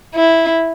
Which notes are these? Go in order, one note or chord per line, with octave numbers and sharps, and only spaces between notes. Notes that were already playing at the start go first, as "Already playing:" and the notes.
E4